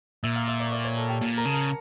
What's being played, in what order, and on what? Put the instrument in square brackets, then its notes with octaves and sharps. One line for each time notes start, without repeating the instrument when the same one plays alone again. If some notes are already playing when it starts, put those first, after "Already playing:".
[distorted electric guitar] A#2 [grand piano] E5 E6
[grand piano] F5 F6
E5 E6
D5 D6
C#6
D5 D6
C#5 C#6
A4 A5
G4 G5
[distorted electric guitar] A#2
[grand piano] A#4 A#5
[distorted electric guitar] C#3 [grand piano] A5
[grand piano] A#4 A#5